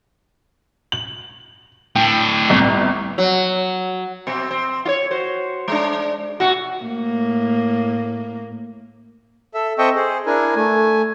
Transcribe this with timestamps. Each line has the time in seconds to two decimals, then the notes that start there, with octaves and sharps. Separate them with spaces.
0.92 F#7
1.96 A2 D4 G5
2.49 G1 C2
3.18 F#3
4.27 B2 C4
4.51 C4
4.85 F4 C#5
5.11 F#4 C5
5.68 G#3 D4
6.40 B2 F#4
6.84 A2 A#3
9.54 A4 E5
9.78 C4 A4 D#5 E5 G5 C#6
9.95 G#4 C5
10.26 D4 E4 A#4 G#5
10.56 A3 G#5